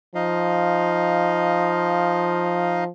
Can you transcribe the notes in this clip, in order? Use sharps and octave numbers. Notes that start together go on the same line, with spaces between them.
F3 D#4 D#5 F5